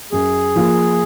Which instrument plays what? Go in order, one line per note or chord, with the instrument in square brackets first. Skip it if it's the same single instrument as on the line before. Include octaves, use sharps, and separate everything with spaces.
[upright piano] F#2 [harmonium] G#4
[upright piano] F3 A#3 F4